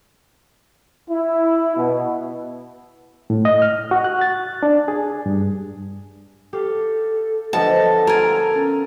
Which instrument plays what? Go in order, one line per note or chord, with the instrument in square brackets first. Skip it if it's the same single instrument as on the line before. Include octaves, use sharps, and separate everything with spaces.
[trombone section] E4
B2
[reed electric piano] A2
D#5
F6
F#4
F#6
A6
D4
G#4
G2
[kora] G4 F5 [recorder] A4
[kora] D3 F3 B3 [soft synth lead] A4 [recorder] D#5 [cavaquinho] A5
[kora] F4 [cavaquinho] A#4 G#5 [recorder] A#5
[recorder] C#4